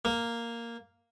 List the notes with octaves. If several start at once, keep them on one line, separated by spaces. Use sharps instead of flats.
A#3